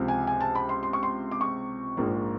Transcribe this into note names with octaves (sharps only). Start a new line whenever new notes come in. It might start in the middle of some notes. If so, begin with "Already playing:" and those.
Already playing: C#2 C3 F3
G#5
G#5
A5
B5
C6
C6
C#6
C6
D6
C#6
A#1 G#2 F3 A#3